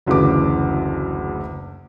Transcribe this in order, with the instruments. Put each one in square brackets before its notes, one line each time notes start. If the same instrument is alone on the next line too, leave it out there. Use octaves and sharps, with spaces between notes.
[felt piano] F#1 D2 C#3 E3 B4 D6